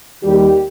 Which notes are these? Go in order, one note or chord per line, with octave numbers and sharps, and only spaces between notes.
D#2 D#3 G3 G4